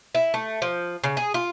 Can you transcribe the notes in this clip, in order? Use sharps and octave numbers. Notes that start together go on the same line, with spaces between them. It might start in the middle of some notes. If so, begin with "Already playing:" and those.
E4
A3
F3
C#3
G#4
F4